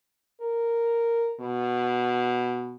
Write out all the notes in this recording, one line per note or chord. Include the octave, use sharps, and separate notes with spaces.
A#4
B2